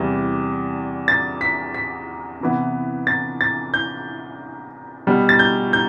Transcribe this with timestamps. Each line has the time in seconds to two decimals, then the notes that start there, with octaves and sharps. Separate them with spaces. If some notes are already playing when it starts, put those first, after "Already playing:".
Already playing: E2 C3 E3 G3
1.08 A6
1.41 B6
1.74 B6
2.40 C3 E3 B3
3.07 A6
3.41 A6
3.74 G6
5.07 B2 G3 B3
5.29 A6
5.39 G6
5.73 G6